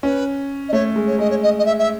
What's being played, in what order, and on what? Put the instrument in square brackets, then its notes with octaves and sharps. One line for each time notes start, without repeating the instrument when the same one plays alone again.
[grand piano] C#4 [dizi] B4
[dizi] D#5
[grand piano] A3 [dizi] C#5
[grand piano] G#3
[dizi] C#5
[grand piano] G#3 [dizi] D#5
[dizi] C#5
D#5
D#5
E5
E5